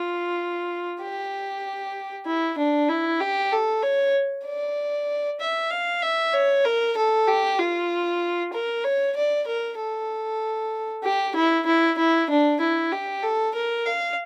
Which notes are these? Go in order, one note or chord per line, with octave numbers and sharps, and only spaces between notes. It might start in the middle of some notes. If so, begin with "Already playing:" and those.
Already playing: F4
G4
E4
D4
E4
G4
A4
C#5
D5
E5
F5
E5
C#5
A#4
A4
G4
F4
A#4
C#5
D5
A#4
A4
G4
E4
E4
E4
D4
E4
G4
A4
A#4
F5